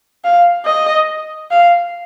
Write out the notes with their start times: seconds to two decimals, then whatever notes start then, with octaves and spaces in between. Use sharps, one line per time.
0.24 F5
0.66 D#5
1.51 F5